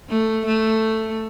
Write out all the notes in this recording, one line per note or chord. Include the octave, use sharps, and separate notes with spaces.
A3
A3